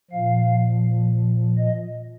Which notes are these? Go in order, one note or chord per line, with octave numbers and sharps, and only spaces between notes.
A#2 F3 F5
D#5